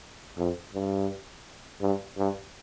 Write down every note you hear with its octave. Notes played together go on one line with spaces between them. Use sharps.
F2
G2
G2
G2